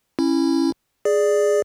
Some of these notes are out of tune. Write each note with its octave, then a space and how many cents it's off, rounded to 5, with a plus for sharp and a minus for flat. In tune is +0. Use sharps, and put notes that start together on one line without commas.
C#4 -20 E4 +0
G#4 +0 D5 +5